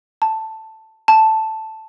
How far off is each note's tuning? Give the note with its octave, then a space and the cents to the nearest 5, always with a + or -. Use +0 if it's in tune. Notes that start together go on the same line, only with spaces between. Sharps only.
A5 +5
A5 +0